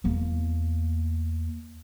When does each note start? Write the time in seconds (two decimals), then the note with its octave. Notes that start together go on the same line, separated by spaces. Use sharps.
0.04 E2 A#3